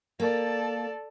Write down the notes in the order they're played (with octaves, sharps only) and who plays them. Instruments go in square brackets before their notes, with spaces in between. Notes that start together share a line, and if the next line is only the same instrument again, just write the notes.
[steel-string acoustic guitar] A#3 [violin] A4 D5